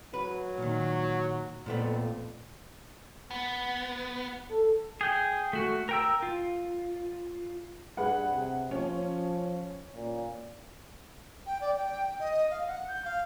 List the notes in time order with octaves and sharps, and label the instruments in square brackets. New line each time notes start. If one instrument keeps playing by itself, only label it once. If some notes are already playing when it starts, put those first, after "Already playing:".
[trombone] F#3 [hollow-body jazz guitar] B4
[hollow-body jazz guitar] A#2 D#3
[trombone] F2 [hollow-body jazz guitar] A#2 A3 B3
[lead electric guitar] B3
[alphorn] A4
[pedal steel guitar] G#4 G5
A3 F#4
A#4 G5 E6
F4
[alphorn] G2 [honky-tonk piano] G#4 B4 F#5
[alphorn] C3
[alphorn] F3 [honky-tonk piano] C#4
[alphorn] A#2
[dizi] G5
D5
G5
D#5
F5
F#5
G6
F5